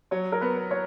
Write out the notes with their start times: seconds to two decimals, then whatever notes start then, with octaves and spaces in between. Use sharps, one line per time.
0.11 F#3 C#5
0.32 A#4
0.41 B3 B4
0.71 C#5